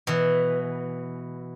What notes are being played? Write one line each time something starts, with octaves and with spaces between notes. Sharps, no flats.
B2 E3